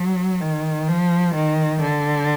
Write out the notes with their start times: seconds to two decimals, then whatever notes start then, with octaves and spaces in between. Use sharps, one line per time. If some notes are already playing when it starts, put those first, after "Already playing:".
Already playing: F#3
0.41 D#3
0.88 F3
1.35 D#3
1.81 D3